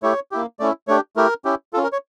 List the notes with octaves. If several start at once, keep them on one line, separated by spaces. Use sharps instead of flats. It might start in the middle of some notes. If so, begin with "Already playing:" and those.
A3 E4 G4 C#5
A#3 E4 G4
A3 C#4 E4 D5
A3 D4 G4 C#5
A3 E4 G4 A#4
C#4 E4 G4
C#4 F4 A4
A#4
C#5